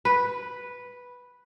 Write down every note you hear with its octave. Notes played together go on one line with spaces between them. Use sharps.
B4